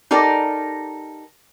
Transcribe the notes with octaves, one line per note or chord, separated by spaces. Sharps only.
D#4 G4 A4 A#4 D5